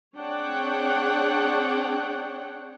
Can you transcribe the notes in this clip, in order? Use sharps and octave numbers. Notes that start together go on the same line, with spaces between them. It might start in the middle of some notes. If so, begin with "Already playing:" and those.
C4 D4 G#4 C#5 F#5 G5